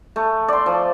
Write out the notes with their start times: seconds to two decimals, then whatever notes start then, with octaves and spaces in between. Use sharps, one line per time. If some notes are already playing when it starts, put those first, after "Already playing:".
0.16 A3
0.48 D5 C6
0.66 F3